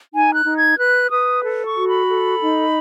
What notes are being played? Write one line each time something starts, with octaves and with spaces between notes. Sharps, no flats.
D#4 G#5
F#6
D#4
G#6
B4 F#6
B4 D#6
A4
C#6
F#4
B5
A4
D#4